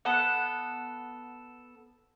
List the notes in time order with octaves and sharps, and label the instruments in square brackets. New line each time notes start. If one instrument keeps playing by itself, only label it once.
[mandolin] B3 A4 F#5